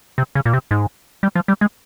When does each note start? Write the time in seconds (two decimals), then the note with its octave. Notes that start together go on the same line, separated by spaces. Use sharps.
0.18 C3
0.35 C#3
0.46 A#2
0.53 C3
0.71 G#2
1.23 G3
1.35 F3
1.48 G3
1.61 G#3